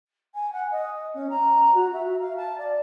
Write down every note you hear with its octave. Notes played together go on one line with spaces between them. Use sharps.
G#5
F#5
D#5
C#4
A#5
F#4
E5
F5
A5
D5